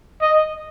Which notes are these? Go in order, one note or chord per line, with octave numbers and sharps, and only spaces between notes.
D#5